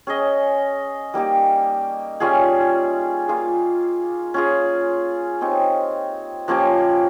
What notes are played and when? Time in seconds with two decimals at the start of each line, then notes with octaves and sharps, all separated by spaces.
0.07 C#4 G#4 D#5
1.14 G3 A#3 D#4 G4
2.20 G3 C#4 F4 G#4
3.28 A#3 F4 G#4
4.34 C#4 F4 G#4
5.41 C4 D#4 G4 C#5
6.48 F3 A#3 C#4 G4